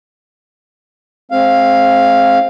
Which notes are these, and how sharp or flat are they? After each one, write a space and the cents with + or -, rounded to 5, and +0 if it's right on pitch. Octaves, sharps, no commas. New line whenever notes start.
G#3 +45 C4 +25 F5 +0